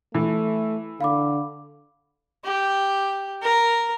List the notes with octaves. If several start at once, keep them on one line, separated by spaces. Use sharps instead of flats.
E3 A3
D3 F5 B5 D6
G4
A#4